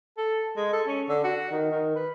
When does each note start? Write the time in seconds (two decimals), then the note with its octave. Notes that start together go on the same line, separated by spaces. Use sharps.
0.18 A4
0.57 G#3
0.73 A4
0.87 C#4
1.09 D3
1.24 F#4
1.51 D#3
1.71 D#3
1.96 B4